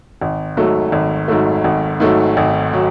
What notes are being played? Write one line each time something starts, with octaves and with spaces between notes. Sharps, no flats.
G#1
G#2 F#3 A3
G#1
G#2 F#3 A3
G#1
G#2 F#3 A3
G#1
F#3